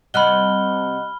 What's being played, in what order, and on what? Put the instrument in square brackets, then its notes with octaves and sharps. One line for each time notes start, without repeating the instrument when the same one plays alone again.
[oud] C3 G3 [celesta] D#5 F#5 F#6 [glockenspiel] B5 F6 G7